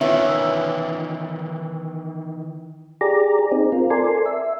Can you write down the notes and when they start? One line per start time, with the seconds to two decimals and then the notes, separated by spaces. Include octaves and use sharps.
0.01 D#3 E3 B3 C#4 F4 E5
3.01 G4 G#4 D5 A#5
3.51 C4 D#4 G#4
3.72 C4 F4 A#4
3.90 A4 A#4 D5 G#5 C6
4.26 E5